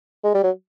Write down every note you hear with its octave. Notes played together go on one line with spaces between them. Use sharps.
G#3
G3
F#3